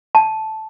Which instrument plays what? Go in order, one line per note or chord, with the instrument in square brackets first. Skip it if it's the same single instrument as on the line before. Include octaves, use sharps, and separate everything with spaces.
[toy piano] A5